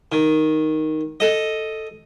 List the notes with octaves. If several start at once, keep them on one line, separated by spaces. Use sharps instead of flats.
D#3
A4 D#5